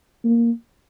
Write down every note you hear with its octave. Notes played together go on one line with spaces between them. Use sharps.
A#3